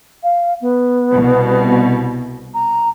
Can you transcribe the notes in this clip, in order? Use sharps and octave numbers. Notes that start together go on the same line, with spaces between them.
F5
B3
C2 B2
A#5